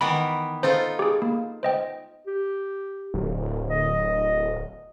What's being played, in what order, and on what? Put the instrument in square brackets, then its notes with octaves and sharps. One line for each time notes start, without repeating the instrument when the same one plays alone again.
[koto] D#3 E3 B3 [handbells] B5
[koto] D#4 F4 A4 [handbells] C5
[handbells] G4 G#4
A#3
C5 D#5 G5
[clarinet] G4
[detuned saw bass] D1
[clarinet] D#5